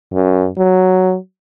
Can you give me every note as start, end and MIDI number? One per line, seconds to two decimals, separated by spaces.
0.13 0.47 42
0.58 1.16 54